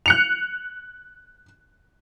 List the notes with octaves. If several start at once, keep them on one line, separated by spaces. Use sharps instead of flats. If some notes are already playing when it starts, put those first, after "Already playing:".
F#6 C#7 F7